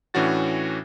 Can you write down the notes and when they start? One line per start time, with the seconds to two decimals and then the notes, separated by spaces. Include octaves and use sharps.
0.14 A2 E3 C#4 D4 F#4 A6